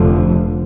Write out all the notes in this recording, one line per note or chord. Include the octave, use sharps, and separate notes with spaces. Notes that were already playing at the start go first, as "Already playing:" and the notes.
Already playing: F1 F2 D3 F3